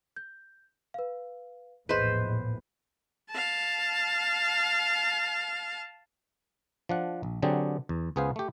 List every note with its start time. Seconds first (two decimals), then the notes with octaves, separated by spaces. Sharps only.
0.16 G6
0.94 B4 F5
1.89 A#1 E2 A2 G#4 B4 C5 D#5
3.31 F5 A5
6.89 F3 D4 F#5
7.23 A#1
7.42 D3 F#3 C4 D4 G4 G#4
7.89 E2
8.16 C#2 B3 G#4 B4 C5 F5
8.36 A3 G4